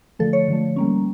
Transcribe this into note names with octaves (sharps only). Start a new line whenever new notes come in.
D3 F3 A3 A4
C#5
D3 F3 A3
G3 A#3 C#4